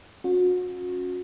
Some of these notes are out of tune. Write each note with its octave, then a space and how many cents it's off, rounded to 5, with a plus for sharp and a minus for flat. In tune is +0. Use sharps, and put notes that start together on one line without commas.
C#4 -5 F#4 -35